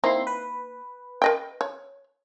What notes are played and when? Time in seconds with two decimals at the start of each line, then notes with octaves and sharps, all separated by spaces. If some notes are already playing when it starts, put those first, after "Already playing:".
0.04 A#3 C4 D#4 E4 C6
0.27 B4
1.22 A#4 D#5 G5
1.61 C#5